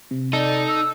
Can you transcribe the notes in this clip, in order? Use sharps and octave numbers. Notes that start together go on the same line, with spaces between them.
C3
D#4 A4 D5
E6